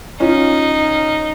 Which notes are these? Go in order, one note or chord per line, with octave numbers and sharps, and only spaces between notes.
C#4 D#4 F4